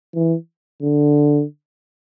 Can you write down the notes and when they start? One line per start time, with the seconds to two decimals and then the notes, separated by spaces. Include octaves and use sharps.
0.14 E3
0.82 D3